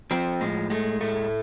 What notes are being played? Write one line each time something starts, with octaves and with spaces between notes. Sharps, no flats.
F3 C4
A2 G#3
G#3 A3
A2 A3